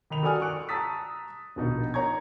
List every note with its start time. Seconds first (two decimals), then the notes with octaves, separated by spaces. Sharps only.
0.10 D#3 D#4 B5 F7
0.23 F#4 A4 D5 G#5 D#6 F6
0.42 C#6 F#6 D7
0.69 A5 A#5 D#6 E6 A6 B6
1.56 A#1 B2 D#4
1.94 C#5 A#5 C#6 G#6